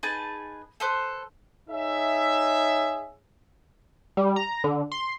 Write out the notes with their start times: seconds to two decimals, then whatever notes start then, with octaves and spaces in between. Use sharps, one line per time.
0.03 D#4 G#4 B4 A5
0.80 A4 B4 C5
1.69 D#4 G#4 C#5 E5
4.17 G3
4.36 A#5
4.64 D3
4.92 C6